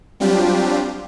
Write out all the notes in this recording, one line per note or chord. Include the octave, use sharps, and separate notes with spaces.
F#3 G3 C4 D4 F4 G4